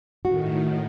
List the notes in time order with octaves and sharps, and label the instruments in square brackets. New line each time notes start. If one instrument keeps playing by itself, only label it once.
[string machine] A2 D#3 [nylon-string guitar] F#4